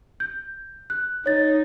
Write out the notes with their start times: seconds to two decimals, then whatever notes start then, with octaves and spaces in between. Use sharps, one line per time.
0.20 G6
0.90 F#6
1.26 D#4 C#5 A6